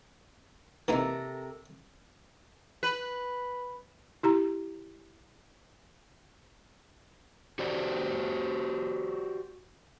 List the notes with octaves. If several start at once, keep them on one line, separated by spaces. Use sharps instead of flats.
C3 E3 A#3 D#4 A4 A#4
B4
E4 G4 A#5
F#4 G4 C5 D5